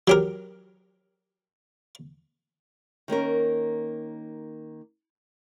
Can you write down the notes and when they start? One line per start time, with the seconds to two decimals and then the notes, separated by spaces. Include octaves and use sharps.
0.08 F#3 G4 A#4
3.08 D#3 A#3 C#4 A#4